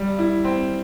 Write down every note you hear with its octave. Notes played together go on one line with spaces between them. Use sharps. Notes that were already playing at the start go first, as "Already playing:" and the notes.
Already playing: G3
E4
C4